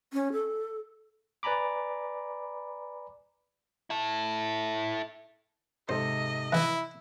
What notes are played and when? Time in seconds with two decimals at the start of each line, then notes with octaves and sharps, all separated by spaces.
0.13 C#4
0.33 A4
1.43 B4 D5 G#5 A#5 B5 D6
3.90 E4 A4
5.89 G#2 C3 A4 C5 D#5
6.53 E3 E4